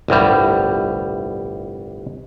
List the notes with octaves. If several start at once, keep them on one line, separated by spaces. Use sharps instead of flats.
G1 C2 A2 G3